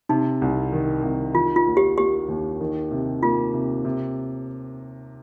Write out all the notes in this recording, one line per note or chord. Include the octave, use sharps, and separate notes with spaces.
C3 D#4
C2
D#3
C2
D#3 F4
F4
D#2
G4
A#3 G4
D#2
D#3
C3
A#3 F4
C3
C3